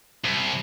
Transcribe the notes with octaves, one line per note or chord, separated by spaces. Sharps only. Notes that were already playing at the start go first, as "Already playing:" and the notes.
C2